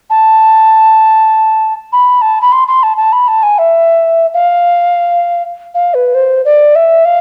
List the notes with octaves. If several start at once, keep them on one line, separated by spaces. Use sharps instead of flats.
A5
B5
A5
B5
C6
C6
A5
A5
B5
A5
G#5
E5
F5
F5
B4
C5
D5
E5
F5